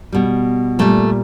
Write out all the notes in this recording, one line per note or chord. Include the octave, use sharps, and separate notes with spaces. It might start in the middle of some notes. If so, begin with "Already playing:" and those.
B2 G3
A#2 G3 A3